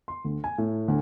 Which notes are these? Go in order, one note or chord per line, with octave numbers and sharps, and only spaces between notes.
C6
D2
G#5
A2
D2